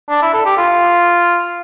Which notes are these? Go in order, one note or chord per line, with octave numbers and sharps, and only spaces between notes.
D4
E4
A4
G4
F4